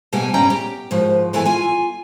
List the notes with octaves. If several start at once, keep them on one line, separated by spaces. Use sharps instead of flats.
B2 G3 A#3 G4 F#5 G#5
G2 G3 C#4 G5 A#5
G4
D#2 G#2 F3
G2 E3 B3 A4 B4 G#5
F4 G#5